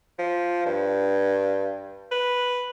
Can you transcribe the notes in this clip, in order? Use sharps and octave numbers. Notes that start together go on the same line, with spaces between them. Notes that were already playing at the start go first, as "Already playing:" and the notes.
F3
G2
B4